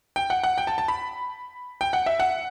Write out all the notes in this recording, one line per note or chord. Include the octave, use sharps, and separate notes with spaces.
G5
F#5
F#5
G5
A5
A5
B5
G5
F#5
E5
F#5